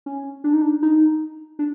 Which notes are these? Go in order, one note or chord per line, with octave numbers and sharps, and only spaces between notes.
C#4
D4
D#4
D4
D#4
D4